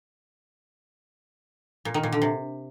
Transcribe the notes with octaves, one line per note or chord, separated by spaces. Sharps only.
A#2
D#3
A#2
D3
C3